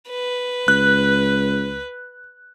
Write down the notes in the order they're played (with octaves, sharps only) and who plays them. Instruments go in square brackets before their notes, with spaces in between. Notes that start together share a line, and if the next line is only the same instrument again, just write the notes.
[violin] B4
[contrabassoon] C#2 [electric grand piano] F#6